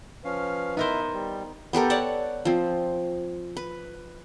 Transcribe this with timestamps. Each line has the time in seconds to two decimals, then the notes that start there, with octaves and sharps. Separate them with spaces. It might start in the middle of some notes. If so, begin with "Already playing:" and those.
0.25 F3 C#4 B4 F5
0.77 B3 D#4 E4 A#4 C5 E5
1.14 G3
1.73 B3 G4 A4 A#4
1.90 C#5 D5 F#5 A5
2.45 F3 C4
3.57 B4